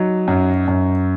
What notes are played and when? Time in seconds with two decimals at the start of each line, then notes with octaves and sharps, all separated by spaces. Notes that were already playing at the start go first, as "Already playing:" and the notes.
Already playing: F#3 D#4
0.28 F#2
0.68 F#2